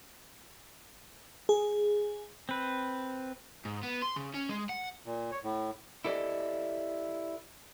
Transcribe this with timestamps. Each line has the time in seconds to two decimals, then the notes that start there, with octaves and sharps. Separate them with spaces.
1.49 G#4
2.49 C4 B4
3.65 G#2
3.83 B3
4.03 C6
4.17 C#3
4.34 C#4
4.50 G#3
4.69 F#5
5.06 A#2
5.31 C#5
5.43 A2
6.05 E4 G4 A4 D5 D#5